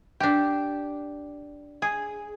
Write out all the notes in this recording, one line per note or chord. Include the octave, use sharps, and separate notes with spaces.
D4 G4
G#4